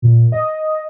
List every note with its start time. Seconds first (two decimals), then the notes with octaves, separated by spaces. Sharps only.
0.02 A#2
0.32 D#5